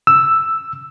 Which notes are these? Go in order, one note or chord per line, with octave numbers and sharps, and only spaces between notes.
E6